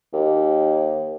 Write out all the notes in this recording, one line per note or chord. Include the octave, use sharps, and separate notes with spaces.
D#2